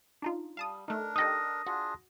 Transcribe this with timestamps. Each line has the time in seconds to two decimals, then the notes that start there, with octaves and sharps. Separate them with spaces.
0.22 D4 D#4 F4
0.57 G3 F5 A5 D#6
0.88 A3 D4 D#4 A#4
1.16 D#4 G4 A4 D#6 A#6
1.66 D4 F4 F#4 G#4